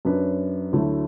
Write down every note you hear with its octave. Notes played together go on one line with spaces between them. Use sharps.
F#2 F#3 D4 B4
D2 D3 F#3 A3 E4